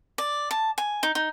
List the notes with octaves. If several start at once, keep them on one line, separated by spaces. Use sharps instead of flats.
D5
A5
G#5
D#4
D#4